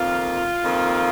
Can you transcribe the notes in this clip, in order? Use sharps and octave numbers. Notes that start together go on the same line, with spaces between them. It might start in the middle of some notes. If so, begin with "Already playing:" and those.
Already playing: F2 D#3 A#3 F4
F2 D#3 A#3